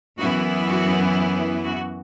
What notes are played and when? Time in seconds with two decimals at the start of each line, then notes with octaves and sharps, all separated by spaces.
0.18 F#2 E3 B3 E4 F#4
0.67 F#4
1.64 F#4